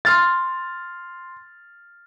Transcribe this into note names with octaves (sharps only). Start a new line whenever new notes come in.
C6 F6 A6